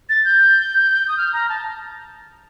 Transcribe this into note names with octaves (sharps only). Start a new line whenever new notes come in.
A6
G6
D#6
F6
A#5
A5